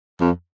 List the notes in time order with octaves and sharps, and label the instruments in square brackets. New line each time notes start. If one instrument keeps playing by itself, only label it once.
[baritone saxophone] F2